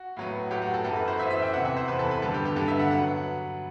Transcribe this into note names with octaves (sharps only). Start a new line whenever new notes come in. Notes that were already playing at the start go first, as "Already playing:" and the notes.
Already playing: F#4
A2 F#3 B3
A2 F#3 B3 G4
F#4
A4
F#2 E3 B3 A4
B4
C5
F#2 E3 B3 E5
E5
G5
E2 C3 E3 F#5
E5
C5
E2 C3 E3 B4
A4
B4
G2 D3 G3 B3 A4
G4
G4
G2 D3 G3 B3 A4
E5
F#5
F#3 B3 F#5